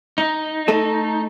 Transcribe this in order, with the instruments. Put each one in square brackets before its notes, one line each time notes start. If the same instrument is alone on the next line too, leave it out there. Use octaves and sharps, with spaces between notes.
[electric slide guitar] D#4
[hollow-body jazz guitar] A3 A4 D#5